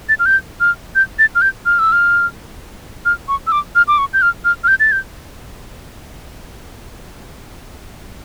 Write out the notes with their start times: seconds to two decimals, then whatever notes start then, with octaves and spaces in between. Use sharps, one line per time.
0.09 A6
0.19 F6
0.26 G6
0.60 F6
0.95 G6
1.19 A6
1.35 F6
1.42 G6
1.66 F6
1.79 E6
1.92 F6
3.05 F6
3.28 C#6
3.47 E6
3.52 D6
3.75 F6
3.88 D6
3.98 C#6
4.14 G6
4.22 F6
4.45 F6
4.64 F6
4.68 G6
4.80 A6
4.92 G6